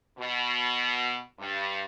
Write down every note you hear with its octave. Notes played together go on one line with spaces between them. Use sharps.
B2
G2